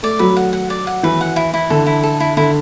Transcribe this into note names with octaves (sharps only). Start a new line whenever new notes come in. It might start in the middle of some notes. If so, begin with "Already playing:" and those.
A3 D5
F#3 B4
F#5
F#5
D5
F#5
E3 B4
F#5
E4
E4
D3 A4
E4
A4
E4
D3 E4